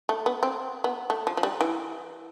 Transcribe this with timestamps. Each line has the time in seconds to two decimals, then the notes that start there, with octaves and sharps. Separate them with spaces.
0.09 A3
0.26 B3
0.43 C4
0.84 B3
1.10 A3
1.27 F3
1.37 F3
1.43 G3
1.61 E3